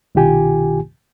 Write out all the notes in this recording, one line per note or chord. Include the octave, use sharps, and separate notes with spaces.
C2 B2 D#3 F4 G4 G#5